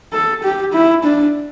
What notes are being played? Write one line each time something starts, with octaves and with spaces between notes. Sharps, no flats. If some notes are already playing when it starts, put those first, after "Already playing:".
A4
G4
E4
D4